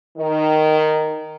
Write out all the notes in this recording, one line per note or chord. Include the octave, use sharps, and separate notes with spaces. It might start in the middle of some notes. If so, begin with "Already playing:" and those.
D#3